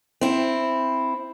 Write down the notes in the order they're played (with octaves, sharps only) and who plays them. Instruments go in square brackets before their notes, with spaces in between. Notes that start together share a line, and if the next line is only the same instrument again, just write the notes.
[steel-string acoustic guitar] C4 E4